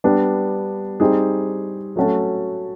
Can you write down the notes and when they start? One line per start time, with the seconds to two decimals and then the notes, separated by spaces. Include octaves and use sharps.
0.04 G3 B3 D4
1.00 G3 C4 D#4 G#4
1.96 F#3 A3 C#4 F#4 A4